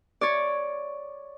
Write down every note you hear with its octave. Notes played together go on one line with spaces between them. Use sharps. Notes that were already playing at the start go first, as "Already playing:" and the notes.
C#5 D5